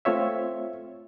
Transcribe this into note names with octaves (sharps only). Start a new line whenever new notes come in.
A3 C4 F4 C#5 E5